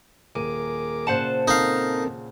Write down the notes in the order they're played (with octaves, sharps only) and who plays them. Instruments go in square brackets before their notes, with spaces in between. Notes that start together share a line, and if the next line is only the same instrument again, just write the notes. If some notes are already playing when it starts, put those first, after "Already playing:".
[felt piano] D#1 D#7 [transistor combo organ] G#4 A#4 D6
[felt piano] A#2 C#3 [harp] C5 F#5 A5
[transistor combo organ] C4 A4 A#4 [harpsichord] D#4 F5